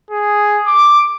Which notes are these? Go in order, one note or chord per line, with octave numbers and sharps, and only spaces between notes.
G#4
D6